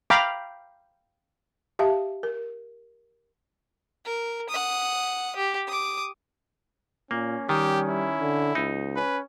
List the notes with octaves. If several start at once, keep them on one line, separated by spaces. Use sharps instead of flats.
F5 G5 A#5 B5 D6
G4 E5 F5 A5
A#4
A#4
F#5 D#6
G4
D6 D#6
A#2 A#3 C#4
D#3 G3 G4
E4
D3
C#2 D#4
C#4 B4